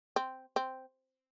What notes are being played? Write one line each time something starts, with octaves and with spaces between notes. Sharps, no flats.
C4
C4